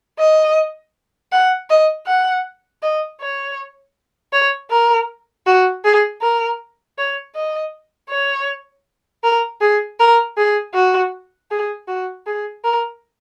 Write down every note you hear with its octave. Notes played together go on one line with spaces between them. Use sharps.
D#5
F#5
D#5
F#5
D#5
C#5
C#5
A#4
F#4
G#4
A#4
C#5
D#5
C#5
A#4
G#4
A#4
G#4
F#4
G#4
F#4
G#4
A#4